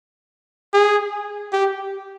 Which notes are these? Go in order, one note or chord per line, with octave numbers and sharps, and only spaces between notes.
G#4
G4